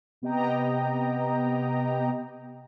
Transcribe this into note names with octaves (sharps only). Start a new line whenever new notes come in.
C3 B3 G4 D#5 G5 A#5